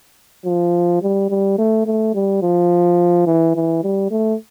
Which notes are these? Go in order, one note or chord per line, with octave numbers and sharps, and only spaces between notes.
F3
G3
G3
A3
A3
G3
F3
E3
E3
G3
A3